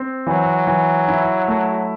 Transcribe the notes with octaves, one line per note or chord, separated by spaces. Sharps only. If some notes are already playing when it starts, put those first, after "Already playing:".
Already playing: C4
E3 F#3
E3
E4
A3